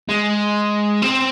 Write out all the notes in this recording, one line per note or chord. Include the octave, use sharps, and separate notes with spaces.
G#3
C4